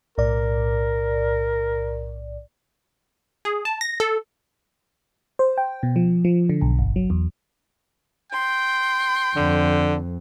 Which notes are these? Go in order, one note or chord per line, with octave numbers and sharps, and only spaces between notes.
B1 A2 A#4 D5
G#4
A5
A#6
A4
C5
G5
B2
F3
F3
D3
B1
G1
F#3
E2
G5 C6
F2 D3